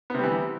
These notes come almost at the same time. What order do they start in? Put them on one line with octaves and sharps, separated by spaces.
B3 C3 G3 E3